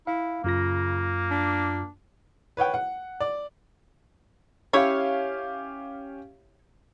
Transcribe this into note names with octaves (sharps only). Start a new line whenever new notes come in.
E4 F5
F#2 C#3 A#3 F4 A#6
D4
B4 C#5 F#5 G5
F#5
D5
C#4 E4 G4 C#5 F5